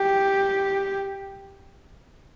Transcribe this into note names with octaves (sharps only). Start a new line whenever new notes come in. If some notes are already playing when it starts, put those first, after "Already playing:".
Already playing: G4